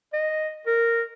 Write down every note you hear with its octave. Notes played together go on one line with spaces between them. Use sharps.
D#5
A#4